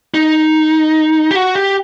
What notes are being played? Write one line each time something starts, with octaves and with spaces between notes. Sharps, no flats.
D#4
G4
F#4
G4